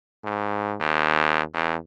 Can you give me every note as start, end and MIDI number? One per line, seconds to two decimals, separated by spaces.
0.24 0.75 44
0.81 1.42 39
1.54 1.76 40